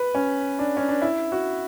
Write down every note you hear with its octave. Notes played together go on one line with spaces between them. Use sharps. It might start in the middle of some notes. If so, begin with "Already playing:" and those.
Already playing: B4
C#4
D4
C#4
D4
E4
F#4